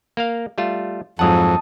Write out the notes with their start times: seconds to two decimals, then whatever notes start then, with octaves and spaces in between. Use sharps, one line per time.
0.17 A#3 A#4 F5
0.58 G3 A3 F4
1.19 F2 G#2 F#3 F#5 A5 D#6